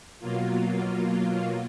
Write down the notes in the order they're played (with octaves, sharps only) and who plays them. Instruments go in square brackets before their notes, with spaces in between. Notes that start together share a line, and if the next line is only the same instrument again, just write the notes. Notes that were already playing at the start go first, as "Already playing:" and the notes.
[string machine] B2 F#3 A#3 F4